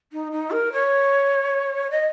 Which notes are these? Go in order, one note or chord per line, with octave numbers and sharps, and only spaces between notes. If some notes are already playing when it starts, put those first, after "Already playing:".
D#4
D#4
A#4
C#5
D#5